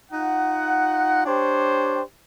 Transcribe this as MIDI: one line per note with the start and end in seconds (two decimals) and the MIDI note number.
0.12 1.22 63
0.12 1.22 65
0.12 1.22 78
1.24 2.01 62
1.24 2.01 67
1.24 2.01 72
1.24 2.01 73
1.24 2.01 79